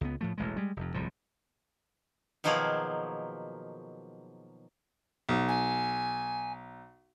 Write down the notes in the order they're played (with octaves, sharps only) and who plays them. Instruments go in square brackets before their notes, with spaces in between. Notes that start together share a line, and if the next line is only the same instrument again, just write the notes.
[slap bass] C#2 B3
A2 F3 A3
E1 A1 G#3
G3 G#3
F1 F2
D1 C2 A2 F3
[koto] B2 D#3 F3 F#3 A#3 G#4
[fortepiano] B1
[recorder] G#5